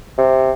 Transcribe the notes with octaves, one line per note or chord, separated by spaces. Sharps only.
C3